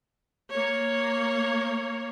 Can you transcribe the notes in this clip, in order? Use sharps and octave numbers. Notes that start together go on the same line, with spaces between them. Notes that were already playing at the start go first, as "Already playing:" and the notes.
A#3 C#5